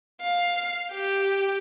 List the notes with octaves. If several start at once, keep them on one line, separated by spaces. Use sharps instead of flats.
F5
G4